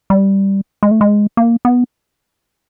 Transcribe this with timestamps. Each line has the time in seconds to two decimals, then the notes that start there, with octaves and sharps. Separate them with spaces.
0.10 G3
0.83 G#3
0.91 A3
1.01 G#3
1.37 A#3
1.65 B3